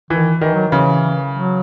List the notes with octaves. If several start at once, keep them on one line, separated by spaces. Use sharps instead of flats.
D#3 E3
D#3 E3
F#3
C#3 E3
F#3